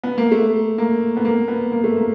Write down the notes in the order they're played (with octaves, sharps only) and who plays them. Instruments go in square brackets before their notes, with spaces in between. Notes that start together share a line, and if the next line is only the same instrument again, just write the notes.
[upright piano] B3
A#3
A3
A#3
B3
A#3
B3
A#3
A3
A#3